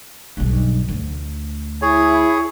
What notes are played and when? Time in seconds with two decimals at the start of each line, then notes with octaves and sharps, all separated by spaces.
0.37 B1 G2
0.88 D2
1.82 E4 G#4 C#5